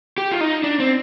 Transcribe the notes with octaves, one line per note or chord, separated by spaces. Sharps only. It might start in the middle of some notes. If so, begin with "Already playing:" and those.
G4
F4
D#4
D4
C4